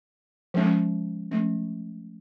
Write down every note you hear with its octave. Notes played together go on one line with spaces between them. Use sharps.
F3 G#3 C#4
F3 A3 C#4